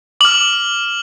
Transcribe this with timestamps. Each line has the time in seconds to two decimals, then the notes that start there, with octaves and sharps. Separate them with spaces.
0.21 D6 F6 F#7